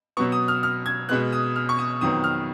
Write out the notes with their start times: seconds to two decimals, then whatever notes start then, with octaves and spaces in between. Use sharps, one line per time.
0.17 B2 F#3 B3 C#6
0.32 D#6
0.48 F6
0.63 F6
0.86 G#6
1.09 B2 G#3 B3 F#6
1.32 D#6
1.56 F6
1.69 C#6
1.79 D#6
2.01 F2 D#3 F#3 B3 D#6
2.24 F6